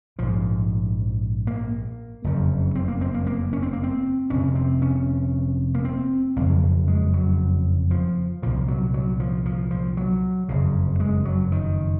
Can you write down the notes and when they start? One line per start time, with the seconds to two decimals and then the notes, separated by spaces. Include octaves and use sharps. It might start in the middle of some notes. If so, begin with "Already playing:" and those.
0.19 A#1 G#2 F3
1.47 A#3
2.24 F#1 F2 C#3
2.75 C4
2.88 A#3
3.01 C4
3.14 A#3
3.27 A#3
3.53 C#4
3.62 C4
3.73 A#3
3.83 C4
4.30 F1 F2 C3 C#4
4.55 C4
4.82 C#4
5.74 A#3
5.85 C4
6.36 F#1 F2 C#3 A#3
6.88 G#3
7.14 F#3
7.91 F3
8.42 C2 A#2 F3
8.68 F#3
8.94 F#3
9.20 F3
9.45 F3
9.71 F3
9.97 F#3
10.49 F#1 F2 C#3
11.00 G#3
11.25 F#3
11.52 D#3